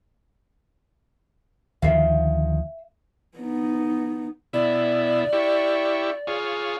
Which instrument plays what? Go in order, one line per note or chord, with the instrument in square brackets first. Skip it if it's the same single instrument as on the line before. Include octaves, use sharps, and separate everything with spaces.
[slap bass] D2 D#3 F3 [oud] E5 F5
[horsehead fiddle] B3 D#4
[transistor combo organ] B2 E4 [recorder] D5
[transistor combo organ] E4 G4 C#6
F4 G#4 C#5